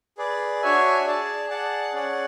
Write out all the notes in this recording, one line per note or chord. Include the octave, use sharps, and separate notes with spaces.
G#4 B4 D5
D4 F#4 C#5 E5 G#5
G#4 D5 A5
G#4 D5 F#5 A5
C#4 G#4 D5 F#5